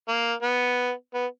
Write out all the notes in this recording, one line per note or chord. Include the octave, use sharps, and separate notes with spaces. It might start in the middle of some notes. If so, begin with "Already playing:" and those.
A#3
B3
B3